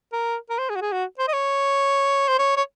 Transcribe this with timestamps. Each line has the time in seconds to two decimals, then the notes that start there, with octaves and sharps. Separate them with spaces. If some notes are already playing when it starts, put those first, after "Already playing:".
0.13 A#4
0.50 A#4
0.58 C5
0.70 G#4
0.76 F#4
0.81 G#4
0.92 F#4
1.19 C5
1.28 D#5
1.33 C#5
2.28 C5
2.39 C#5
2.57 C#5